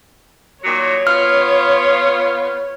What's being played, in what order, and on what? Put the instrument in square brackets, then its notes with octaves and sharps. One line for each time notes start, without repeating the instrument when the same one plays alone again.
[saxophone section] A#2 D#3 F#3 [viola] C#5
[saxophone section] B3 F4 [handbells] F6